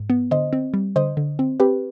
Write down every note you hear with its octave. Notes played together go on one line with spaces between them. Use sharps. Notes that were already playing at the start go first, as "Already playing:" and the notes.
Already playing: G#2
B3
D3 C5 D#5
C4
G3
D3 C5 D#5
D3
C4
C4 G4 B4